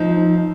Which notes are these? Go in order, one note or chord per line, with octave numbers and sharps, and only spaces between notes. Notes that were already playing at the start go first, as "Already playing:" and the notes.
Already playing: F3 C4 D#4